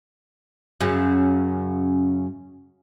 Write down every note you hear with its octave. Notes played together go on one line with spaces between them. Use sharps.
F#2 C#3 C#4